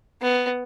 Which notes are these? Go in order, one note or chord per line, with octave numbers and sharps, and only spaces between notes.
B3